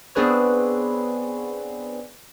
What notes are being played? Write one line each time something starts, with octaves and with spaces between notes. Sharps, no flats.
B3 C4 D4 G#4 B4 C#5